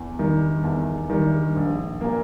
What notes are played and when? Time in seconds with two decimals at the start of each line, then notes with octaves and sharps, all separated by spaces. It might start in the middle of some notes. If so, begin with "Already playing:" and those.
Already playing: E2
0.19 D#3 G3
0.64 E2
1.10 D#3 G3
1.56 A#1
2.01 A#2 A#3